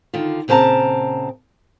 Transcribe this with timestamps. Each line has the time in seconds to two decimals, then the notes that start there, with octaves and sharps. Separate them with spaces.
0.13 D3 D#3 F4
0.48 A#2 C#3 C4 B4 A5 A#5